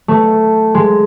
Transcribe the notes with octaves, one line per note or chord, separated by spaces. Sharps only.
A3
G#3